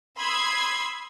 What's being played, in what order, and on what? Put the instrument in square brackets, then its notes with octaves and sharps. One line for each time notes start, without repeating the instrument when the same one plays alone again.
[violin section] B5 C6 D#6 E6 G#6 C7